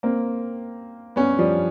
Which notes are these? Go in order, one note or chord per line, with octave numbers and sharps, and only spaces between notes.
A#3 C4
B3 C#4
F3 G3